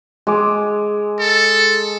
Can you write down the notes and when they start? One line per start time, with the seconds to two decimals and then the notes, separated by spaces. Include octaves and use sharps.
0.27 G#3 D6
1.20 A4